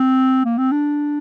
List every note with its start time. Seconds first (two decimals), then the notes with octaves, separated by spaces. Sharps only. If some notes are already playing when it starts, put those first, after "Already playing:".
Already playing: C4
0.45 A#3
0.58 C4
0.72 D4